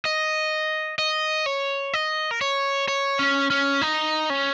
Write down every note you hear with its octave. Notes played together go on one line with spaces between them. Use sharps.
D#5
D#5
C#5
D#5
A#4
C#5
C#5
C#4
C#4
D#4
C#4